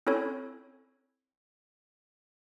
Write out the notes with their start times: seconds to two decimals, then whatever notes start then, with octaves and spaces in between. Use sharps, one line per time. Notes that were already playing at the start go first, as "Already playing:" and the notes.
0.07 C4 C#4 E4 A4 C#5